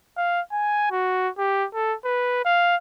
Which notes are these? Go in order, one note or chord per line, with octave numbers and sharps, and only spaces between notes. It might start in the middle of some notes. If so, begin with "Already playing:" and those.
F5
G#5
F#4
G4
A4
B4
F5